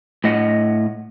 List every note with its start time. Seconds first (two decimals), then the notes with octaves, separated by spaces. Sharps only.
0.24 A2 D#5 F#5